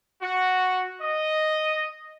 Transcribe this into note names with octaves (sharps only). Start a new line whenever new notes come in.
F#4
D#5